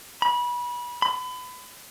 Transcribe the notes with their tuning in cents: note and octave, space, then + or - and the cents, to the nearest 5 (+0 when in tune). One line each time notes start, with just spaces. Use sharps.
B5 -25
B5 +30